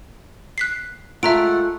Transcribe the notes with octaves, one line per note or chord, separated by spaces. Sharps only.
F#6 B6 C7
G#3 A3 F4 A4 E5 F#5 A#5 D7